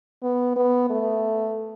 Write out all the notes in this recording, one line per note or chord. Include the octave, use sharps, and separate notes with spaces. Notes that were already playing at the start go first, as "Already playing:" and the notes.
B3
B3
A3